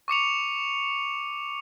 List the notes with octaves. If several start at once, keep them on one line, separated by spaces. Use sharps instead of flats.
C#6 D6 C#7 F7